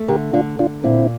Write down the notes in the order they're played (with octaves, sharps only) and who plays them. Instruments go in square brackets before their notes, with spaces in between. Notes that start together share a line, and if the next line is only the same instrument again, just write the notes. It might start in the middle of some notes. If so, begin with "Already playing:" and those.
Already playing: [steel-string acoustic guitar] A3
[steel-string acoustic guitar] D3 [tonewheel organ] G4 A#4
[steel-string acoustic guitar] D3 [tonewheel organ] D4 F4
[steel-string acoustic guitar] D3 [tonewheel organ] D4 F4
[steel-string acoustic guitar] A#2 [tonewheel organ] C4 E4